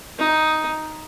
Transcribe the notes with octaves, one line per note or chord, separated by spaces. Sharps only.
D#4